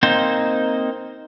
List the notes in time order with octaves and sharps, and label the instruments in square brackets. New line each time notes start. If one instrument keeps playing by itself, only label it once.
[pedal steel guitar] A#3 C4 D#4 C5